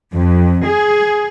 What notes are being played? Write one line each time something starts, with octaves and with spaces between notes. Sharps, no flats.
F2
G#4